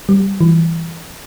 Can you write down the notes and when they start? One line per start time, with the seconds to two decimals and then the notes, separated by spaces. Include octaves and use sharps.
0.09 G3
0.41 E3